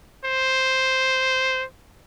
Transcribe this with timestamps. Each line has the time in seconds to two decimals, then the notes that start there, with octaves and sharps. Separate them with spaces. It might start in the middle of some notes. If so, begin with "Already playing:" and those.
0.24 C5